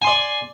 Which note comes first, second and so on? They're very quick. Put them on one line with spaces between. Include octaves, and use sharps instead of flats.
G#5 C6 D5